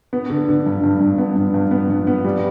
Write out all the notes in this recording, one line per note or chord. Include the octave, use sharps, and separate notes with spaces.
B3
D3
D3
G2
G2
G2
B3
G2
G2
B3
G2
B3
G3